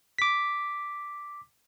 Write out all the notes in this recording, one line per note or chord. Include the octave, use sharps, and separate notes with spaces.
D6 B6